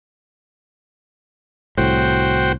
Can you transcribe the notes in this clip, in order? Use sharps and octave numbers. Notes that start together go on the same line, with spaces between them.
C2 A2 F#4 C5 G5